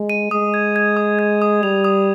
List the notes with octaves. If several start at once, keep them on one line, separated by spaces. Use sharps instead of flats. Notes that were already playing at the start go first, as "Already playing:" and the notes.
Already playing: G#3
D#7
G#3 D#6
G#6
G#6
D#6
G#6
D#6
G3 F7
D#6